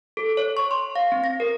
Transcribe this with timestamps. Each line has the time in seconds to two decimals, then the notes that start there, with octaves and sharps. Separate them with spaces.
0.17 A4
0.37 C#5
0.57 C#6
0.71 C6
0.95 F5
1.12 C4
1.24 A#6
1.40 A#4